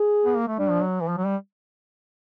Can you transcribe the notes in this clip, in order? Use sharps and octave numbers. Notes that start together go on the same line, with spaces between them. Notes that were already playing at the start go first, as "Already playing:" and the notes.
Already playing: G#4
B3
A#3
A3
G3 D4
F3
F#3
E3
F3
F#3
G3